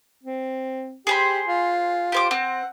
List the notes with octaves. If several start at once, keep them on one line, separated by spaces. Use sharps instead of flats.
C4
G4 G#4 C5 B5
F4
G4 C5 D6
C4 F#5